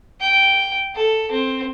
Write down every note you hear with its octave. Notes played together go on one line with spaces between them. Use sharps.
G5
A4
C4